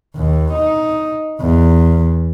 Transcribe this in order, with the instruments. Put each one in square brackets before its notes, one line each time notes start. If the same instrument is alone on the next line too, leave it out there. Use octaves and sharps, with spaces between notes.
[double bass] D#2
D#4
E2